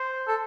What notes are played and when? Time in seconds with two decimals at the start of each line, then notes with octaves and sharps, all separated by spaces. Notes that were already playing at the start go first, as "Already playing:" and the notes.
Already playing: C5
0.28 A4